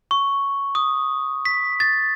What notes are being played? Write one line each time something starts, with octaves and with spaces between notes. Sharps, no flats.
C#6
D#6
B6
A6